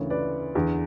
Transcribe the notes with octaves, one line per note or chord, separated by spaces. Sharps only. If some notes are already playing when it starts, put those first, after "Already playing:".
Already playing: D2 C#3 E3 A#4 C#5
B4 D5
E2 D3